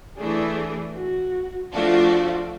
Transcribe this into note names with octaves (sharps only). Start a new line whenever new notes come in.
E3 A3 D4 G#4
F#4
F3 A3 D4 F4 F#4